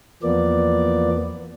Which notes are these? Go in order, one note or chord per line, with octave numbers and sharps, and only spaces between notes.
E2 F3 A#3 B3 D5